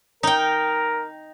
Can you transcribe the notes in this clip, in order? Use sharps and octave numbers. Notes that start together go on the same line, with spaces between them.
D#4 A#4 G5